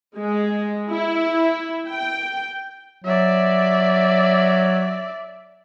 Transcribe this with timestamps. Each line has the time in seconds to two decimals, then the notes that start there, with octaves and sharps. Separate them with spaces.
0.17 G#3
0.91 E4
1.88 G5
3.04 F#3 D5 E5